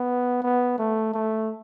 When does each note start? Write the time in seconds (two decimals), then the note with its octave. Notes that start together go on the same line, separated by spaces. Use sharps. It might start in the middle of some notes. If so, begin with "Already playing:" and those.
Already playing: B3
0.43 B3
0.78 A3
1.14 A3